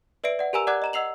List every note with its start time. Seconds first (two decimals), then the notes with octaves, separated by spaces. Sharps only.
0.24 B4 D5 E5 C7 D7
0.39 D5 F#5
0.53 G4 A#4 G#5 A#5 E6 F7
0.67 D5 F#5 A#5 D6 F#6 G#6
0.82 D#5 A#5 E7
0.93 D#5 F#5 E6 C7 F7 F#7